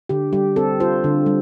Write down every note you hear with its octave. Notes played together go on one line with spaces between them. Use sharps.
D3 G4
G3 G4
C4 A4
F4 C5
D3
G3